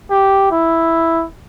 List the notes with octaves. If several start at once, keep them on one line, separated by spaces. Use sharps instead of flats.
G4
E4